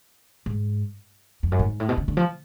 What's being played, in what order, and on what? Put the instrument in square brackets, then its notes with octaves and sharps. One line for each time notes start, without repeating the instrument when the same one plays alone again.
[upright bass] G#2
F2
F#2
G#2
A2
B2
C#3
D3
F3